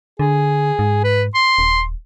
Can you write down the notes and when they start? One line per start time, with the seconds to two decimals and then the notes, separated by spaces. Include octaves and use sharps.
0.19 D3 G#4
0.79 G#2
1.04 B4
1.35 C6
1.58 D#1